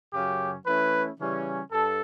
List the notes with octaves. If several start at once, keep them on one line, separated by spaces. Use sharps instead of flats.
F#2 C#3 F#3 C#4 G4
E3 A3 C#4 E4 B4
C#3 E3 G3 C#4
G2 A4